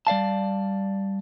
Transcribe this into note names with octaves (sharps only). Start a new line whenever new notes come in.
G3 D5 F5 A5